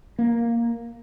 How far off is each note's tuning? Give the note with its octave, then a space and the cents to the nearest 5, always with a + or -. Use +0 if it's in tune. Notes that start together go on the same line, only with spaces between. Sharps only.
A#3 +0